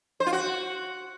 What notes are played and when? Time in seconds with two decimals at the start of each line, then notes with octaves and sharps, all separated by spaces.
0.20 C5
0.26 F4
0.33 F#4